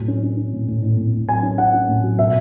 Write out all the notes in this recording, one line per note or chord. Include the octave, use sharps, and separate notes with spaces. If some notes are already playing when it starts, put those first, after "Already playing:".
Already playing: A2 F#3
C#4
C#4
C#4
A2
A2
A2
A2
A2
F#3 G#5
C#4
C#4 F#5
C#4
A2
F#3
B2 E5